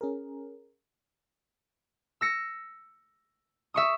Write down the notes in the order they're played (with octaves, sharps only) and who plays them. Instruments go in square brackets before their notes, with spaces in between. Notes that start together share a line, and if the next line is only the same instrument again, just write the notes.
[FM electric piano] C#4 G#4 A#4
[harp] E6 A#6 C#7
E5 C#6 D#6